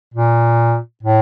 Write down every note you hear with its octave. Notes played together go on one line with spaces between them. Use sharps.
A#2
A2